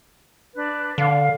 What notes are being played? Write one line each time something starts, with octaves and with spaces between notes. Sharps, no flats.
D4 B4
D3 F5